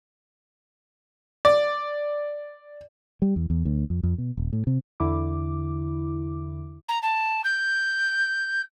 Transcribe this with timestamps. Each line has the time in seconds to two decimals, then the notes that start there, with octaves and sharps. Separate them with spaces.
1.45 D5
3.22 G3
3.36 E2
3.50 E2
3.65 D2
3.90 F2
4.03 F2
4.18 B2
4.37 D#1
4.53 A2
4.67 C3
5.00 E2 D3 E4 D6
6.88 A#5
7.02 A5
7.44 G6